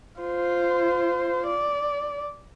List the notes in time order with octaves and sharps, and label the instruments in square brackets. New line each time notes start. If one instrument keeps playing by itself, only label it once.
[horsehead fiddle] F4 C5
D5